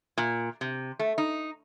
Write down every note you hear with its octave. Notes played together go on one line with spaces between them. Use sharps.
A#2
C3
A3
D#4